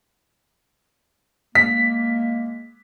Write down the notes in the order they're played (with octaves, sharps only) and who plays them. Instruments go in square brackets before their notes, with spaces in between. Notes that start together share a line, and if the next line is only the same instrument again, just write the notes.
[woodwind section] G#3 A#3 [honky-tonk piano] B6